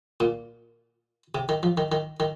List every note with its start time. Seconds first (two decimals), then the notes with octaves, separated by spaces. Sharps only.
0.20 A#2
1.35 C3
1.49 D#3
1.63 F3
1.77 D#3
1.92 D#3
2.20 D#3